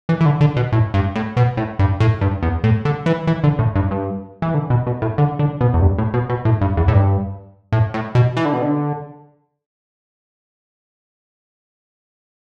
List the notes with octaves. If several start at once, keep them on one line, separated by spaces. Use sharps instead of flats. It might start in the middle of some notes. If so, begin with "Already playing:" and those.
E3
E3
D3
D3
B2
A2
G2
A2
B2
A2
G2
A2
G2
E2
A2
D3
E3
E3
D3
A2
G2
G2
E3
D3
B2
B2
A2
D3
D3
B2
E2
G2
A2
B2
B2
A2
G2
E2
A2
G2
A2
A2
B2
E3
D3
B2
D3